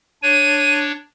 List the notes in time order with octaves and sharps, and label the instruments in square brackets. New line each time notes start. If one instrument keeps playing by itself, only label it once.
[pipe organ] D4 C#5 [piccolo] D#7